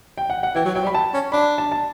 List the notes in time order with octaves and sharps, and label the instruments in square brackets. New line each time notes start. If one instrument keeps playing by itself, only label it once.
[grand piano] G5
F#5
F#5
[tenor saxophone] E3 [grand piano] G5
[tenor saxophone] F#3
[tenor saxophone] F#3 [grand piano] G5
[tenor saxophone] G3
[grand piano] B5
A5
[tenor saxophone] C#4
[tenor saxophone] D4 [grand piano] B5
[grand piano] A5
A5